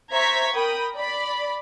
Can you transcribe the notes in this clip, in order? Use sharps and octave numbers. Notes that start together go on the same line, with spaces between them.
C5 E5 A#5 C#6 G#6 B6
A#4 G5 B5 D#6
D5 B5